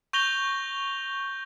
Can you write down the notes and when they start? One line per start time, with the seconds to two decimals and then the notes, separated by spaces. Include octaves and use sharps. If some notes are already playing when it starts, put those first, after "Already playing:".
0.13 C#6 G6 A#6 F7 G7